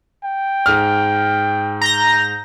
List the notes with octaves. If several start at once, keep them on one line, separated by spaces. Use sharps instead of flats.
G5
G#2 F6
A#5 G6 A#6